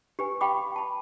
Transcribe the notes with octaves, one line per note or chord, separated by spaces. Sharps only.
G4 B4 G#5
G4 F5 G5 B5 D6
A5 B5